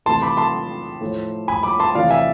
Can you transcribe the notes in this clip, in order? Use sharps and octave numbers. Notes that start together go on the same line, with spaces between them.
C3 E3 A3 A5 C6
B5 D6
A5 C6
A2 F3 A3
G#5 B5
B5 D6
A5 C6
C3 E3 A3 D5 F5
E5 G#5